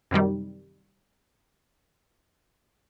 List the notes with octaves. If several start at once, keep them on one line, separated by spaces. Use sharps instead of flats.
F#2 C3 D#3 G3